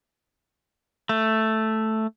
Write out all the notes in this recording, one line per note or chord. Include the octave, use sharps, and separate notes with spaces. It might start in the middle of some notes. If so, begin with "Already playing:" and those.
A3